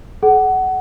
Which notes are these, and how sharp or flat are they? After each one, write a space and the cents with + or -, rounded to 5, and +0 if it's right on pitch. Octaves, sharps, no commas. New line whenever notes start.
G#4 +45 F#5 +20